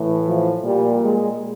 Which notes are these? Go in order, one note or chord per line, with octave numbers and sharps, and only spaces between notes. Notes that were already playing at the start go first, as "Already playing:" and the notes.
Already playing: A2 E3
F3
A#2 G3
G#3